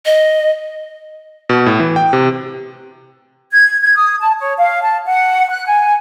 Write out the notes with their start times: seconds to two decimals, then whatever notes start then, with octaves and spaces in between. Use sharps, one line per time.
0.06 D#5
1.49 B2
1.66 A2
1.80 E3
1.96 G5
2.13 C3
3.53 G#6
3.82 G#6
3.96 D#6
4.21 A5
4.39 C#5
4.57 F5
4.82 A5
5.06 F#5
5.50 F#6
5.67 G#5